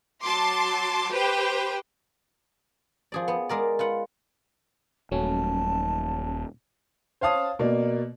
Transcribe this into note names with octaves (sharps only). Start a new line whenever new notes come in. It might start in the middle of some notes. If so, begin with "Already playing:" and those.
F#3 A5 C6 D6
G4 B4 C5 G5
F3 G#4 D5
B3
G#3 A#4 D5
F4 B4 F#5
D#1 F#3 A3 C#4 A5
C5 C#5 F5 A5 D#6
B2 A#3 D5